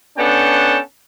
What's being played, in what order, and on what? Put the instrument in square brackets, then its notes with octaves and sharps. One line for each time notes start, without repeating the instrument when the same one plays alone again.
[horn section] B3 C#4 D4 A4 G5 A5